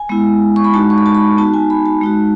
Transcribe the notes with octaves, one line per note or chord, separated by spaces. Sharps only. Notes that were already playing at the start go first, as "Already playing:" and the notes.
Already playing: G#5
G#3 B3 E4
C#6
B5
G#3 D#4 F#4 A5
C#6
B5
A5
B5
B3 D#4 F#4 A5
G#5
B5
A5
G#3 D#4 F#4